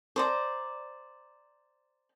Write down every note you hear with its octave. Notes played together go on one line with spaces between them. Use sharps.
C5 D5 A#5